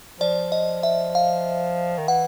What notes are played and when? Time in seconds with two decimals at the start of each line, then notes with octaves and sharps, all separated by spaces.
0.20 F3 D5
0.52 D#5
0.83 E5
1.15 F5
1.98 D#3
2.08 E3 F#5